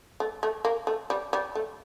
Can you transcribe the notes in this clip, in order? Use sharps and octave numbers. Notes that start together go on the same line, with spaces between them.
A3
A3
A#3
A3
G3
G3
A3